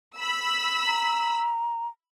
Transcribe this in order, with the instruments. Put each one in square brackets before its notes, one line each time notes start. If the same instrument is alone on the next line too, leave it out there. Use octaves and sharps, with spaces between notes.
[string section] B5 E6
[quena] A#5